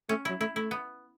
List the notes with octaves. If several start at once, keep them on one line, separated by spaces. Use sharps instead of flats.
A3 C#4
F#3 E4
A3 E4
A3 E4
B3